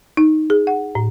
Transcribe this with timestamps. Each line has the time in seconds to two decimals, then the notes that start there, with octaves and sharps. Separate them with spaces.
0.17 D#4
0.50 G#4
0.67 F#5
0.95 A2